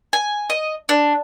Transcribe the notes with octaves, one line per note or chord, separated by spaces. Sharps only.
G#5
D#5
D4